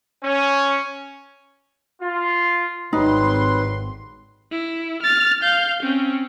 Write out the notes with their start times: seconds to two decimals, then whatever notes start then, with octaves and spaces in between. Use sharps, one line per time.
0.22 C#4
2.02 F4
2.93 G#1 F#3 G3 D#4 B4 C6
4.52 E4
5.03 F6 A6
5.43 F5 G6
5.83 C4 C#4